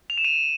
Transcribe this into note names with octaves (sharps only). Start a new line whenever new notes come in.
F7
E7
D#7 F7